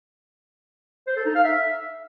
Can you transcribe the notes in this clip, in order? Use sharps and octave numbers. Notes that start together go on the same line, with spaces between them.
C5
A4
D#4
F5
E5